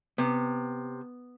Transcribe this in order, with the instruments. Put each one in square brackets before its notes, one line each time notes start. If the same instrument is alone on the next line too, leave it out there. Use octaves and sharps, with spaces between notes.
[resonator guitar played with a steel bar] C3 [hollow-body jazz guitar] B3